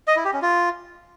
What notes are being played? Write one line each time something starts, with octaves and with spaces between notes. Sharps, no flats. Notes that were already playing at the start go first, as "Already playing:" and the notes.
D#5
E4
G4
C#4
F4